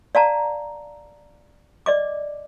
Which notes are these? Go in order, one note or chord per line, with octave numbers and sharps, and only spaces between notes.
D5 F5 A5 A#5
D5 D#5 D6